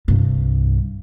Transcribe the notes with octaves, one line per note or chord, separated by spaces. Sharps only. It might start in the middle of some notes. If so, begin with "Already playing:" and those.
C2 G2